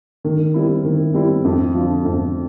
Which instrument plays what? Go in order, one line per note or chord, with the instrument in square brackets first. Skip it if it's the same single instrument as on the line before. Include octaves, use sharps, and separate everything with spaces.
[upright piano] D#3
G3 C4 E4
D#3
G3 C4 E4
F2
D3 F3
F2